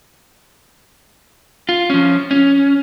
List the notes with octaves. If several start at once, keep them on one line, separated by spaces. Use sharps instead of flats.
F4
F3 C#4
C#4